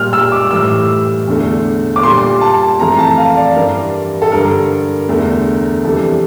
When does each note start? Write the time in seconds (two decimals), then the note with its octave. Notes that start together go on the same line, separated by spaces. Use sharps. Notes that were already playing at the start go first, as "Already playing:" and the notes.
Already playing: A#2 G3 F6
0.13 E6
0.32 D6
0.51 A2 E3 G3 E6
1.27 E2 D3 A3
1.96 D6
2.03 A#2 G3 C6
2.41 A5
2.79 F2 E3 A3 A#5
2.99 A5
3.17 F5
3.37 D5
3.56 G2 E3 G3 A#4
4.22 A4
4.32 G2 D3 G3 A#4
5.09 E2 D3 A3
5.85 F2 C3 E3 G3 A4